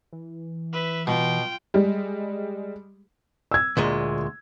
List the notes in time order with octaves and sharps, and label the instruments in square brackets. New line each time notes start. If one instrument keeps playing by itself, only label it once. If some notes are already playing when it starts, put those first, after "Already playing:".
[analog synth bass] E3
[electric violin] B4 E5
[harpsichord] B2 [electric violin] F4 G5
[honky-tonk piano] G3 G#3
[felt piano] E6 G#6
[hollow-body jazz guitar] D2 A#2 G#3